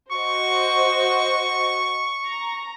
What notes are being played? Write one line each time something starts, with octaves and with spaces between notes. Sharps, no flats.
F#4 C5 D#5 C#6
A#5